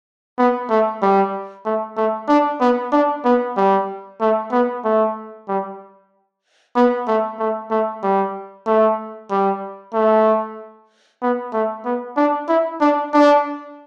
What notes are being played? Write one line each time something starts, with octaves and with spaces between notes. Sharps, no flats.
B3
A3
G3
A3
A3
D4
B3
D4
B3
G3
A3
B3
A3
G3
B3
A3
A3
A3
G3
A3
G3
A3
B3
A3
B3
D4
E4
D4
D4